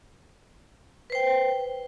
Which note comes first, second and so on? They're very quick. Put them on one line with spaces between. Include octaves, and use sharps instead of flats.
B4 C5 G5